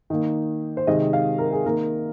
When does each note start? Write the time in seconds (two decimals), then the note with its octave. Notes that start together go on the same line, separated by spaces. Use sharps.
0.10 D#3 A#3
0.77 C5
0.87 C3 D#3 G#3 C4 D#5
1.13 F5
1.38 A#4
1.52 G#4
1.65 D#3 A#3 A#4